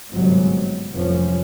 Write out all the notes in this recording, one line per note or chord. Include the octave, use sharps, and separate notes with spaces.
G1 G#2 C3 F#3
F1 C2 F#2 A2 F3 C#4